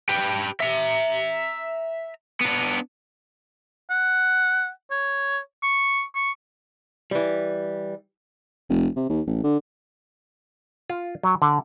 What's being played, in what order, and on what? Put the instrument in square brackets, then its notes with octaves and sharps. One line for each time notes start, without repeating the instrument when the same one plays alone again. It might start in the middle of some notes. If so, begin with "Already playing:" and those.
[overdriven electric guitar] G4 B4
E5 A#5
B3 D4
[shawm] F#5
C#5
C#6
C#6
[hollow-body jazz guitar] E3 G3
[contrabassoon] F1
C3
D#2
A1
D3
[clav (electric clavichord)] F4
F#3
D3